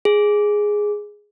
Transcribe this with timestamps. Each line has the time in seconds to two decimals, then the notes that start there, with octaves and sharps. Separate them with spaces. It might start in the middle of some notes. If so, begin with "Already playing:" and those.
0.05 G#4